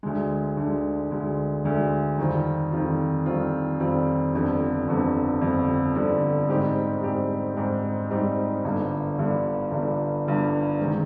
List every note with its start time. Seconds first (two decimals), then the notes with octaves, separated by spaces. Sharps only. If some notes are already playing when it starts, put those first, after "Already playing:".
0.03 D2 D3 G#3
0.56 D2 D3 G#3
1.11 D2 D3 G#3
1.64 D2 D3 G#3
2.18 F2 D#3 G3 C4 F4
2.72 F2 D#3 G3 C4 F4
3.26 F2 D#3 G3 C4 F4
3.79 F2 D#3 G3 C4 F4
4.33 G1 F2 D3 G3 C4
4.88 G1 F2 D3 G3 C4
5.41 G1 F2 D3 G3 C4
5.95 G1 F2 D3 G3 C4
6.48 G#2 G3 C4 D#4 G4
7.02 G#2 G3 C4 D#4 G4
7.56 G#2 G3 C4 D#4 G4
8.11 G#2 G3 C4 D#4 G4
8.64 G1 G2 D3 G3
9.17 G1 G2 D3 G3
9.71 G1 G2 D3 G3
10.25 G1 G2 D3 G3
10.79 C3 D#3 G#3 C4